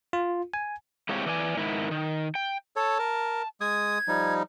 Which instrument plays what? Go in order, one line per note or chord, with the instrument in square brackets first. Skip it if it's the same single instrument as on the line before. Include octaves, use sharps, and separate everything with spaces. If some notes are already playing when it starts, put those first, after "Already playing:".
[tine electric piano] F4
G#5
[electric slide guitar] G#3 C4 E4 F4 G4 C#5
E3 D5 D#5 G#5
G#2 D#3 E4
D#3
G5
[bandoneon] A4 C#5 [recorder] A5
[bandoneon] A#4
[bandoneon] G#3 D#6 [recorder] G#6
[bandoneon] F3 G3 D#4